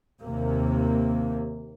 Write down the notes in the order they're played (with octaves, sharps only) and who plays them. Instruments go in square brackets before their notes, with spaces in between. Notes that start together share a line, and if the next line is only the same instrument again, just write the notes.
[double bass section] D#2 C3 A#3